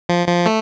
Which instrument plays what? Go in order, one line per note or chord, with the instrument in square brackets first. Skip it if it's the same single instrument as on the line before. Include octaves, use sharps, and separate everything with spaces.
[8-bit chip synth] F3
F3
A3